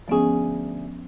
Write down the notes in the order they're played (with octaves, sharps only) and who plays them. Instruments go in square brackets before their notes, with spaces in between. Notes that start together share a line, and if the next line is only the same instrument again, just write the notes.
[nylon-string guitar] D2 G#4 [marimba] F3 B3 C#4